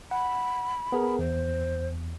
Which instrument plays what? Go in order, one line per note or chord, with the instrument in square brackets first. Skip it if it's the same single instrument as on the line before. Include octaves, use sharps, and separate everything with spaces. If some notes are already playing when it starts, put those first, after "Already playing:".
[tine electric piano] F#5 [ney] B5
[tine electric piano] B3 G#4 A#4
[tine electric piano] E2 [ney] C5